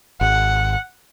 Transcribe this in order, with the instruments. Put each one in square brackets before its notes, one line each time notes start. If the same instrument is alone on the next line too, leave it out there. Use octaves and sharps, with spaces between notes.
[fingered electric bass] G#1 [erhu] F#5